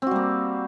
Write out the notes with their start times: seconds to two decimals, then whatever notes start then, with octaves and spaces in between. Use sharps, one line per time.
0.02 C4
0.07 F#4
0.11 G3
0.16 A#3